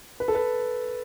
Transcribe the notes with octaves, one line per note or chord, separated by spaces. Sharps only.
B4
A4
B4